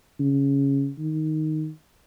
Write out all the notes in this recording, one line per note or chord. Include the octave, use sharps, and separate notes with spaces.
C#3
D#3